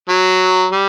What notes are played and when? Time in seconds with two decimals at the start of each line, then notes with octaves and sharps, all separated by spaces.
0.09 F#3
0.72 G3